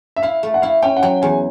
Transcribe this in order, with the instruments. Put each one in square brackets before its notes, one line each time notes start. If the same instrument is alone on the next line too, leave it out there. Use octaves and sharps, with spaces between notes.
[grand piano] E5
[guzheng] E4 [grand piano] F5
[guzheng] A3
[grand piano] F#5
[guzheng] E4 [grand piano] F5
[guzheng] C#4 [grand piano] G5
[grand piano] F#5
[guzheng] F#3 [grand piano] G5
[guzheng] E2 [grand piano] G#5